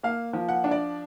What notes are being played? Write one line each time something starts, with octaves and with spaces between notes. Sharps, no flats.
A#3 F5
F3
F#5
D4
D5